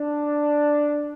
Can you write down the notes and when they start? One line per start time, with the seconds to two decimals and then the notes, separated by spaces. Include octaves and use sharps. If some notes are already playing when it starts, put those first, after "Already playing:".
Already playing: D4